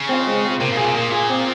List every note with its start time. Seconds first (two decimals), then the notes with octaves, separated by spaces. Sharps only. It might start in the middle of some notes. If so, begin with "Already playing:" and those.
Already playing: C#3
0.09 C4 F4
0.27 G#3
0.44 C4 F4
0.60 C3 A#3
0.69 G#2
0.77 A#2 G#4
0.80 F4
0.86 C3
0.94 A#2 A#3
1.11 F4 G#4
1.29 C4